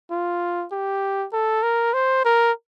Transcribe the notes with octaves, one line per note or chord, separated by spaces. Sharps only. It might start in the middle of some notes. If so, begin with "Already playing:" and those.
F4
G4
A4
A#4
C5
A#4